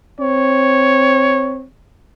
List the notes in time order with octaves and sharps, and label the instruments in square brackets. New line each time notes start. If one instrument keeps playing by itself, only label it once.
[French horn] C4 [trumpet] C#5